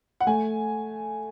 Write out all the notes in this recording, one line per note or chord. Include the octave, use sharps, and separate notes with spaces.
F#5
A3 G#5